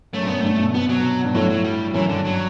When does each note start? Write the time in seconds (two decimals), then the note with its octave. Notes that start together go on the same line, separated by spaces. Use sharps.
0.14 F#2 A3
0.23 G2
0.27 F#2 B3
0.41 G2 A3
0.59 B2
0.74 C3 B3
0.89 B2 F#3
1.24 G2
1.34 A2 F#3
1.50 F#3
1.64 G3
1.94 F#2 E3
2.09 G2 D3
2.25 F#3